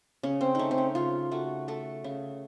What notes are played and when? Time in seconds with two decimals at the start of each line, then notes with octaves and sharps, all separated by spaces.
0.23 C#3 C#4
0.41 C4
0.55 A3 C#4 D#4
0.71 C4
0.78 C#4
0.95 C#3 F4
1.31 A3 F#4
1.68 A3 A4
2.04 C#3